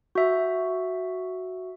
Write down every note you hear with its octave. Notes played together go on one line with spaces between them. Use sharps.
F#4 E5